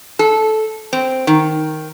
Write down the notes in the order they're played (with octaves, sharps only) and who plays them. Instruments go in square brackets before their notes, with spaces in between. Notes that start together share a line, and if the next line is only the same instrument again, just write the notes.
[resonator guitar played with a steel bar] A4
C4
D#3